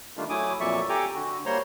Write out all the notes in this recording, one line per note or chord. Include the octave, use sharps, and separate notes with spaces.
D#3 G3 A3 D4 F4
F#3 A3 E4 G#5 D6 D#6
F2 A#2 F#3 D5 E5 C#6
G4 A4 G5 G#5 A#5 D6
D3 F#4
G3 A#3 C5 C#5 A#5 C6